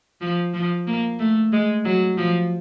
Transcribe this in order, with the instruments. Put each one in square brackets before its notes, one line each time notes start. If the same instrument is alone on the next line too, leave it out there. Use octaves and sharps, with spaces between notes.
[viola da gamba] F3
F3
A#3
A3
G#3
F#3
F3